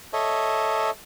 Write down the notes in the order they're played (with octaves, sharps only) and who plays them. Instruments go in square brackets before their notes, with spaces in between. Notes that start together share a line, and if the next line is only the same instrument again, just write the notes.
[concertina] A4 C#5 D#5 E5